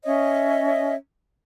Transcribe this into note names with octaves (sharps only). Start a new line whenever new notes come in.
C#4 C#5 D#5 E5